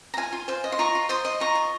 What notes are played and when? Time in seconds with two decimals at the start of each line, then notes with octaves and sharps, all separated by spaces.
0.14 A#5
0.17 F4 F5 G#5
0.33 F4
0.48 C5 F5
0.64 D#5
0.72 C6
0.79 F4 A#5 C#6
0.95 F4
1.09 C5 C6 D#6
1.25 D#5
1.40 F4 A#5 C#6
1.55 F4